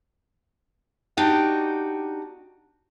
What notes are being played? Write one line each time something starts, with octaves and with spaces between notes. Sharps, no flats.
D4 D#4 F#4 G4 G5